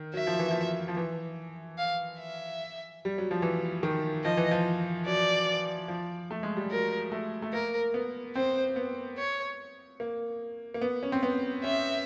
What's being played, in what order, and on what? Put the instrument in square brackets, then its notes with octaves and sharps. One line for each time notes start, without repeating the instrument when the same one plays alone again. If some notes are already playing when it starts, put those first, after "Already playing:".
Already playing: [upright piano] D#3
[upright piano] F#3 [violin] E5
[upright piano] F3
E3
F3
F3
E3
[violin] F5
E5
[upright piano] G3
F#3
F3
E3
D#3
[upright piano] F3 [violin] D#5
[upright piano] E3
F3
[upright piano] F#3 [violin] D5
[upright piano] F3
A3
G#3
G3
[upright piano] F#3 [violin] A#4
[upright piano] A3
A3
[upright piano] A#3 [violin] A#4
[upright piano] B3
[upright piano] C4 [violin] C5
[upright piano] B3
[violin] C#5
[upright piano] A#3
A#3
B3
C#4
C4
B3
[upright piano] C#4 [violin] E5